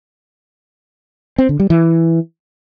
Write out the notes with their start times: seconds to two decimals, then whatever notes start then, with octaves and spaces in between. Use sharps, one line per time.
1.38 C4
1.49 D3
1.60 G3
1.70 E3